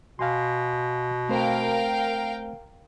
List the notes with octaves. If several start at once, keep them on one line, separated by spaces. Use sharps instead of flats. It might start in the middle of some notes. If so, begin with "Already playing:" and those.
B2 F5 G#5 C6
A3 C4 A#4 C5 F5 G5